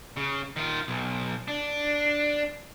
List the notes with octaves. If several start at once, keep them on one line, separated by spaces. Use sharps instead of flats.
C#3
D#3 F4
B1
D4